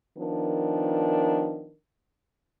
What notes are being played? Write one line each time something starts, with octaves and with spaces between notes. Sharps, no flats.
D#3 F3 B3 D4 A#4